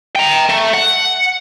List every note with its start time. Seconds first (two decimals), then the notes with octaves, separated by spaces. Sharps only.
0.16 G5 A#5
0.49 A3
0.74 F#5